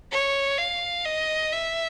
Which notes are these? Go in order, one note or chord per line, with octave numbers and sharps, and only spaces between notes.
C#5
F5
D#5
E5